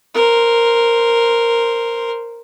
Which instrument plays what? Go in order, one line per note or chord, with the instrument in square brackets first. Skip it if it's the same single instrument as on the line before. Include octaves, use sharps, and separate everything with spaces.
[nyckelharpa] A#4 C5